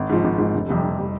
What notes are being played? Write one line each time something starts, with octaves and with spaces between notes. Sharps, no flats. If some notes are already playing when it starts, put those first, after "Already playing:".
Already playing: G#1
G#2 F3
G#1
G#2 F3
F1
F2 C3 G3
F1
C3 G3